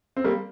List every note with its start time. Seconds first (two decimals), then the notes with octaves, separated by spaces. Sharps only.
0.16 C4
0.24 G3 A#3